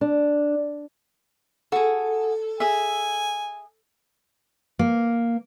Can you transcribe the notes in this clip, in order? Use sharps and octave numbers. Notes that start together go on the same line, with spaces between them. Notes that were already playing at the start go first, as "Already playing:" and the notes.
D4
F#4 G#4 A4
G#4 E5 G#5
A#3